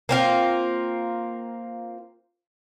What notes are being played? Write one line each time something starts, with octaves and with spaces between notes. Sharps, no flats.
A#3 C4 F4